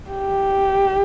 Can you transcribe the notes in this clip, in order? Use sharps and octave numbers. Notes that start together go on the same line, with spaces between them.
G4